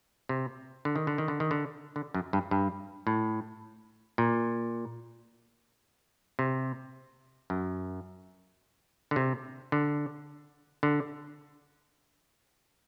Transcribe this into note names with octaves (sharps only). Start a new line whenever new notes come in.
C3
D3
D#3
D3
D#3
D3
D#3
D3
D3
F#2
G2
G2
A2
A#2
C3
F#2
D3
C3
D3
D3